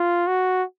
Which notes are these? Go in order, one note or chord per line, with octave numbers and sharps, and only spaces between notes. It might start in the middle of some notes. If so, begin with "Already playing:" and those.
Already playing: F4
F#4